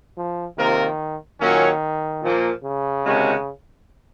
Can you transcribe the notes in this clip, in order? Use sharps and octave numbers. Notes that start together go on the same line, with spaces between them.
F3
C3 D#3 F3 A#3 F4 A#4
A#2 D#3 F#3 A#3 C#4
A#2 F3 A#3
C#3
C3 D#3 G#3 C#4 F#4